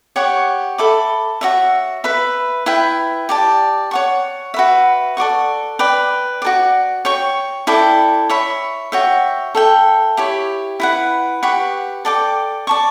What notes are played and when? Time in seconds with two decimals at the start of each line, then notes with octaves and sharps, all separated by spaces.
0.16 G4 C#5 F#5 C#6
0.78 A4 E5 B5 D6
1.41 F#4 C#5 E5
2.04 B4 E5 B5
2.66 E4 B4 E5 G5
3.29 G4 D5 A5
3.91 C#5 F#5 C#6
4.54 F#4 B4 E5
5.17 A4 D5 F#5 C#6
5.79 B4 D5 G5
6.42 F#4 A4 D5
7.05 C#5 G5 C#6
7.67 E4 A4 D5 G5
8.30 C#5 E5 B5
8.92 F#4 C#5 E5 G5
9.55 A4 E5 G5
10.17 E4 G4 C#5
10.80 E4 B4 F#5
11.43 G4 B4 F#5 C#6
12.05 A4 D5 G5 D6
12.67 D5 A5 C#6